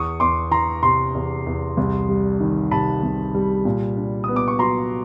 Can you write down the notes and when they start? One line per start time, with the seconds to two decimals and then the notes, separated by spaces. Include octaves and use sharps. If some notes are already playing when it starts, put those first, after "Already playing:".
Already playing: E2 C#6 D#6
0.20 E2 C6 D6
0.51 E3 A#5 C6
0.83 C3 A#5 C6
1.15 E2
1.47 E2
1.77 C2
2.09 G3
2.40 D#3
2.71 C3 A5 B5
3.03 C2
3.35 G3
3.65 A#2
3.96 D4
4.24 B3 D#6
4.36 D6
4.48 C#6
4.59 F#3 A#5 C6